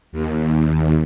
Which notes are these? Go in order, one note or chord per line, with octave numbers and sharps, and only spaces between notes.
D#2